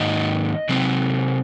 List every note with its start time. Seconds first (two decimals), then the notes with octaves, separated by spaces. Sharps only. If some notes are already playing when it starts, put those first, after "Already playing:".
Already playing: G#2 D#3 A#3 D#5
0.69 C3 F#3 C4